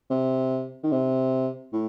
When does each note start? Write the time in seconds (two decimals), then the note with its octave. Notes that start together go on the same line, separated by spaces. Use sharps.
0.10 C3
0.83 D#3
0.92 C3
1.73 A2